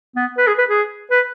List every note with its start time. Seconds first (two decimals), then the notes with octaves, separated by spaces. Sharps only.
0.16 B3
0.38 B4
0.47 G#4
0.58 B4
0.69 G#4
1.11 B4